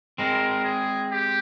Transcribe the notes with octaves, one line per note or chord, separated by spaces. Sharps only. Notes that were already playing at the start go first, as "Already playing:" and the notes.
G#3 C4 A#4
G#4
G4